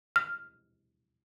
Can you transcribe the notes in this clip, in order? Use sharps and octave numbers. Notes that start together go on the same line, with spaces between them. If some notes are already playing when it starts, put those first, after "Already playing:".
F6